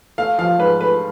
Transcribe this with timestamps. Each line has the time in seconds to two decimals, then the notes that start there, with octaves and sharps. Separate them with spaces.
0.18 A3 F5
0.38 F3 F5
0.59 G#2 B4
0.80 A3 B4